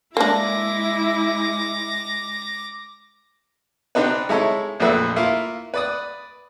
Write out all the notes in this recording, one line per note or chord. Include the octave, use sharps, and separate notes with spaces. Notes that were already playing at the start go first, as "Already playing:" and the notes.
G#3 A#3 D4 E4 D6 A#6
B3 C4 D4 D#4 B4
G#3 D#4 E4 A4 C#5
A#1 F2 A#2 A3 B4 E5
A#3 E4 F4
B4 D5 D#6